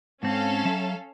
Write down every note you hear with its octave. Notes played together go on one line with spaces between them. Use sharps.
G#2 C4 C#4 A4 F5
F#3 E5 A5